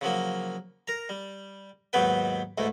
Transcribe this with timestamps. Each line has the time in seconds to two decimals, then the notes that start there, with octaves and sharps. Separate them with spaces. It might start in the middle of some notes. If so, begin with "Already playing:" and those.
0.01 C#3 F3 F#3 A#3
0.88 A#4 A#5
1.09 G3
1.93 D#2 G#2 F#3 B3 B4 G5
2.58 D2 G#2 E3 A3